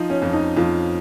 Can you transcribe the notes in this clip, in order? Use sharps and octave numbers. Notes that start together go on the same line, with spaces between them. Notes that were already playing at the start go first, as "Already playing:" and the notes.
Already playing: F3 D#4
C#4
F2
D#4
F2 F4